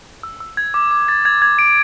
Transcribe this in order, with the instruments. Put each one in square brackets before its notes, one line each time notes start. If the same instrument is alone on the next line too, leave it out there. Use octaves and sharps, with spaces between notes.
[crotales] E6
E6
G#6
D6
D6
A6
G#6
G#6
D7